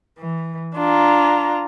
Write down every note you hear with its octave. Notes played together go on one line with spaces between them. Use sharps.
E3
D4 F4 A#5